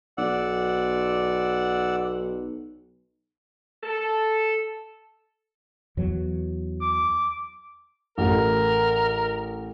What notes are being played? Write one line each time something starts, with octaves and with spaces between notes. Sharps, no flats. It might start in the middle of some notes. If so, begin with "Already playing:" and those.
B1 D5 F#5 E6
A4
E2 E3 F#3
D6
A1 A4 A#4